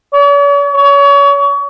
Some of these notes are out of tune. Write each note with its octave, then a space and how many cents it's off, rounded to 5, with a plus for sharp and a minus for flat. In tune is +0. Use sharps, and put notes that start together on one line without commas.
C#5 +45
C#5 +35